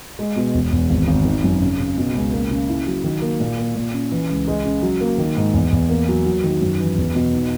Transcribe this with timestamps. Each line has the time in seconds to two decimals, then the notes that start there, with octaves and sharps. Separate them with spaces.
0.19 G#3
0.36 B2
0.54 E1
0.72 E2
0.89 G#1
1.08 G#1
1.25 D#3
1.44 F#2
1.61 C#3
1.80 C#3
1.97 B2
2.14 C#2
2.33 A#3
2.51 C#3
2.69 E4
2.87 F#3
3.04 D#3
3.22 A#3
3.40 A#2
3.58 A#3
3.75 A#2
3.93 C#4
4.12 E3
4.29 C#2
4.48 G#3
4.65 C#3
4.82 F#3
5.01 A#3
5.18 D#3
5.37 G#2
5.54 E2
5.72 E2
5.89 A#3
6.08 F#3
6.25 F#3
6.44 D#3
6.61 F#2
6.80 E3
6.98 E2
7.15 B2
7.33 D#4